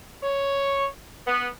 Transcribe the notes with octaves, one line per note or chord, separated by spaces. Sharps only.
C#5
B3